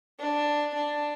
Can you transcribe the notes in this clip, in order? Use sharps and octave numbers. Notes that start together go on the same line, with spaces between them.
D4
D4